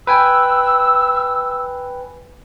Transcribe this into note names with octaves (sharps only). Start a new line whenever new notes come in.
B4 G5 G#5 E6